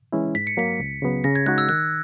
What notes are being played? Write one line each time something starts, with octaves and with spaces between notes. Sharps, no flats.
E3 G#3 C#4 E4
G#2 B6
C#7
F#3 A#3 B6
C#2
C#3 F#3 B3
C#3 A#6
G#6
G#3 D#4 F#4 F#6
E6
D#3 F#6